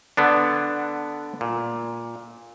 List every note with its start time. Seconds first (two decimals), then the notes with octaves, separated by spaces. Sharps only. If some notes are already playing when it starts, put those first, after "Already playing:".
0.17 D3 B3 D4
1.41 A#2